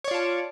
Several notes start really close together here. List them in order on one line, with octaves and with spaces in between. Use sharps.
C#5 D5 F4 A5